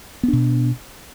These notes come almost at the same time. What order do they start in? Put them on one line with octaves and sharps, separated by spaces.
B3 D4 B2